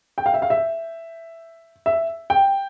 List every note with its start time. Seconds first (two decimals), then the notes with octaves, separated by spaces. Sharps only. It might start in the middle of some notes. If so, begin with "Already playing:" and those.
0.18 G5
0.26 F5
0.34 E5
0.42 F5
0.50 E5
1.86 E5
2.30 G5